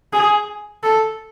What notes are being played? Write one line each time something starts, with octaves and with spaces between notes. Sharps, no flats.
G#4
A4